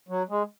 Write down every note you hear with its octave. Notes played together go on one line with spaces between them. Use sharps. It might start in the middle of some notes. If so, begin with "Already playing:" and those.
F#3
G#3